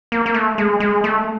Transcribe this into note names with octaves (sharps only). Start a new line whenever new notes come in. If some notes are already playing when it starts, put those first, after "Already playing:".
A#3
A#3
A3
G#3
G#3
A3